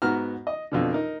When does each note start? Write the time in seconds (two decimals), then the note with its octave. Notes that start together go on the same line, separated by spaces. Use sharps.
0.02 G#2 B3 F#4 A#5 F6
0.47 D#5
0.72 F2 B2 D3
0.92 D#4 A#4